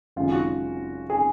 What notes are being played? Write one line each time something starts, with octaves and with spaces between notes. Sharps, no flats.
G#1 F#2 C#3 G#3 F4
F#4
G#4